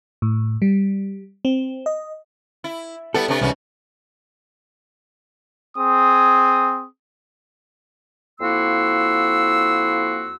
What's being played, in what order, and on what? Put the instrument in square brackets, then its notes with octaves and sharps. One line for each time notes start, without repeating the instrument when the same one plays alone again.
[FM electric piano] A2
G3
C4
D#5
[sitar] E4
[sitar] G3 B3 E4 [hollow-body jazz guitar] A4
[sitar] C3 A3 D4
[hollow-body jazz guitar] C2 [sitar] G#2 E3 C#4
[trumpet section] C4 G#4 D#6
[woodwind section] F2 A#3 E4 F#4 C6 E6